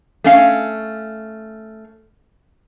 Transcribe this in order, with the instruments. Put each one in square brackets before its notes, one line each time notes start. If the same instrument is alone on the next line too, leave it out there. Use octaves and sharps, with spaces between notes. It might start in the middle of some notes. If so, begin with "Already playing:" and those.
[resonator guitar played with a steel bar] A3 C#4 F5